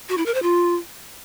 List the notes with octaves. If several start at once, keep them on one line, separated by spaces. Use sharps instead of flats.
F#4
E4
A#4
C5
F4